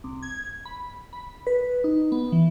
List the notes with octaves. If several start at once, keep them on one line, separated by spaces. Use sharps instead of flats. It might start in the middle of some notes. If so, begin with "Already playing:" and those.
C2
G#6
B5
B5
B4
D#4
B3
E3